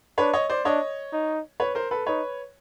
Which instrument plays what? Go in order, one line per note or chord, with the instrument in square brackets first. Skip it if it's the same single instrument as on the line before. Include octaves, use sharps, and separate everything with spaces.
[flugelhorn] D4 [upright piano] B4 C#5
[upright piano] C#5 D#5
C5 D5
[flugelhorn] D4 [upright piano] C#5 D#5
[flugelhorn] D#4
[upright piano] B4 C#5
A#4 C5
A4 B4
[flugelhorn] D#4 [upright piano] B4 C#5